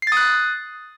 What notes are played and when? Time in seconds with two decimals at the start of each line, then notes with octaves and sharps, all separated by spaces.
0.02 C7
0.07 A6
0.12 D#6
0.17 F#6